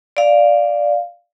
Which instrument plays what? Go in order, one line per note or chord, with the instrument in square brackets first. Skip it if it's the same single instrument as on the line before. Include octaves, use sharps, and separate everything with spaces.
[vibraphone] D5 F5